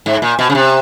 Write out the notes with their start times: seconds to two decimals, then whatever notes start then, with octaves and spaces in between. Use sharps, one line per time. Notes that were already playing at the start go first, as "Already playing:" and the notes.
0.06 G#2
0.22 A#2
0.39 B2
0.50 C#3
0.55 C3